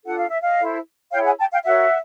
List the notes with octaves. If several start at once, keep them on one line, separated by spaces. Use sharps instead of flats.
D4 F4 A4 F#5
F5
E5
D#5 F5
E4 A4 C5
E4 G#4 C#5 F5 G5
F#5 G#5
G5 A5
F5 G5
F#4 A#4 C#5 E5 F#5